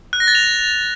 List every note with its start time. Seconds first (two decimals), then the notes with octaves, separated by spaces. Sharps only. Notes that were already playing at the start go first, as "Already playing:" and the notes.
0.13 F#6
0.20 A#6
0.28 A6
0.35 F7